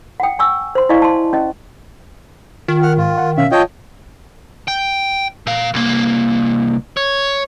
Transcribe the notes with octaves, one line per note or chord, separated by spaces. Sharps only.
F#5 G5
G#5 C#6 E6
C5 C6
E4 D5 D#5 F5 G#5 C#6
A5 C6
C#4 D#5
D#3 F4
F#5 F6
G#2 F4
F#5
B2 C#4 E5 F5
F4 C#5 D#5 F5 G5 A5
G5
A#2 F5
C2 A#3
C#5